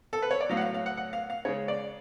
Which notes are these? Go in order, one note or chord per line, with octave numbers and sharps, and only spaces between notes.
A4
B4
C#5
D5
A2 F#3 F5
F#5
F5
F5
F#5
F#5
F5
F5
C#3 G#3 C#5
D5